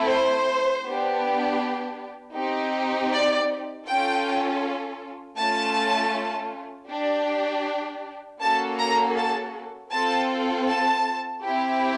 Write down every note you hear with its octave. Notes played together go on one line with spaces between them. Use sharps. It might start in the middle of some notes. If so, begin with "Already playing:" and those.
Already playing: A3 C4 E4 A4
C5
B3 D4 G4
C4 D#4 G4
D5
C#4 F4 A4 G5
A3 C#4 F4 A5
D4 G4
A#3 C#4 F#4 A4 A5
A#5
A5
C4 F4 A4 A5
A5
C4 E4 G4